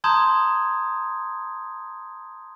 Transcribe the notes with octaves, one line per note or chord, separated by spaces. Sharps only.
A5 A#5 C6 D#6 G6 G#6